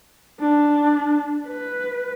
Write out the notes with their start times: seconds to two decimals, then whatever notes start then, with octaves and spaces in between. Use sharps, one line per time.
0.40 D4
1.48 B4